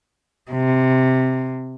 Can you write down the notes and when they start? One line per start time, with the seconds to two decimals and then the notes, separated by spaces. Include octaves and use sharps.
0.51 C3